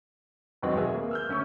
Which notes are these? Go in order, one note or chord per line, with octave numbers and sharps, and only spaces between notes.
E2 G#2 B2 D#3 F#3 C4
G#4 A#4 E5
A#3
E6 F6 G6
D2 C#4 E5 C#6